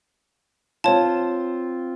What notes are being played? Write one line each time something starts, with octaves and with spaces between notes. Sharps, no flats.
C4 F4 C#5 A5